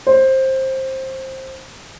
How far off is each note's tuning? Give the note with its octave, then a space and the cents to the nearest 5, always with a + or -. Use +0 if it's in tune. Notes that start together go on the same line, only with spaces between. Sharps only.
C5 +15